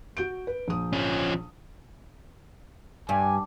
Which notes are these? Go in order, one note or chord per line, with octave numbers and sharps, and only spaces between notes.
F#4 G6 D7
B4
A#1 D#6
F3 C#4
G2 G#5